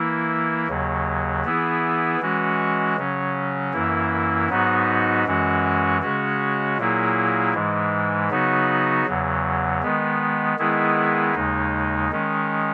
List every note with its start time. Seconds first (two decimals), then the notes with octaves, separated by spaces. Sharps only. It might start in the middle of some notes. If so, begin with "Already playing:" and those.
Already playing: E3 A#3 E4
0.67 D#2 C#3 F#3
1.44 E3 B3 E4 G#4
2.20 E3 G#3 C#4 F#4
2.97 C#3 F#3 C#4
3.73 F#2 E3 A#3 E4
4.50 G#2 F#3 B3 D#4 F#4
5.25 F#2 E3 G#3 C#4 F#4
6.01 C#3 G#3 C#4 F#4
6.77 A#2 F#3 A#3 E4 G#4
7.54 G#2 E3 G#3
8.30 C#3 F#3 B3 D#4 F#4
9.05 E2 C#3 F#3
9.83 D#3 G#3 B3
10.58 D#3 G#3 B3 E4 G#4
11.35 D#2 C#3 G#3 D#4
12.11 D#3 G#3 C#4